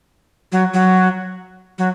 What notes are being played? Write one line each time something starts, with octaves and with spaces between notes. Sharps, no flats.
F#3
F#3
F#3